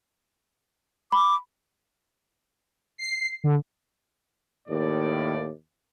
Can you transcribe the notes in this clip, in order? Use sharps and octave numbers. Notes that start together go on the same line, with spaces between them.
B5 D6
C7
D3
D#2 A2 D5